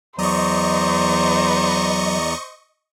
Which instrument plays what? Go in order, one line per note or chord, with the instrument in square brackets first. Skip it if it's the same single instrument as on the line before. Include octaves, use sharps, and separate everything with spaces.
[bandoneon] E2 D5 A#5 [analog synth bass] F#3 [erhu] C5 [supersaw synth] D#5 C#6